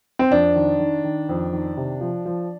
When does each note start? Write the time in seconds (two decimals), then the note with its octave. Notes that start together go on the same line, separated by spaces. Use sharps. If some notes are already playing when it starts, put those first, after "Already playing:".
0.19 C4
0.31 F2 D4
0.56 D#3
0.80 D#3
1.04 D#3
1.29 F2
1.53 D#3
1.77 C3
2.01 F3
2.26 F3